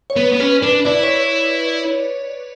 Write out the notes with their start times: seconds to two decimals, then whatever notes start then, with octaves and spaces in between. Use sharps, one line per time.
0.10 C#5
0.16 B3 B4
0.33 B3
0.40 C#4 B4
0.62 D4 B4
0.85 E4 D5
1.03 C#5